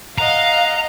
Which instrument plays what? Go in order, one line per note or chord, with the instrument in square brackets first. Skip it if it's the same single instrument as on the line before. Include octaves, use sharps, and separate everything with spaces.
[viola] D#5 F#5 [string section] F5 [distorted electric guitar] A#5